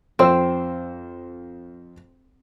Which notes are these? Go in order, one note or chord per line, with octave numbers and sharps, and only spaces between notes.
F2 C4 C5 E6